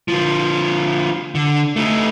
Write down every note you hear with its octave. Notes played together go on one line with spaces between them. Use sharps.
D3 F3
D3
A3 D#4